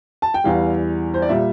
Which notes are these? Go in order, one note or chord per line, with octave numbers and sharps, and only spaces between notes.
A5
G5
E2 E3 G3 F5
C5
D5
A#2 G3 E5